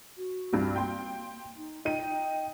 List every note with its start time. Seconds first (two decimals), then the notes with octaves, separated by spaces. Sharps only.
0.17 F#4
0.53 C2 G2
0.76 A#3 G5 C6
1.56 D#4
1.85 D#4 G5 D#7